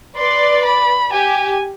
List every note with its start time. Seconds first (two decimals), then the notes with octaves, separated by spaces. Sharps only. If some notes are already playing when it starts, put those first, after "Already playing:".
0.17 B4 D5 C6
0.65 B5
1.13 G4 G#5